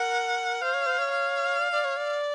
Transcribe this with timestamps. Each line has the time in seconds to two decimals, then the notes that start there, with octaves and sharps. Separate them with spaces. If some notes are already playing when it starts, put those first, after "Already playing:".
Already playing: A#4 F#5
0.61 C5 F5
0.74 C#5
0.86 C5
0.98 C#5
1.11 F5
1.59 D5
1.72 D5
1.84 C#5
1.97 D5